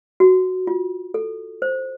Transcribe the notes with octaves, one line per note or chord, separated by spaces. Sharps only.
F#4
F4
A4
C5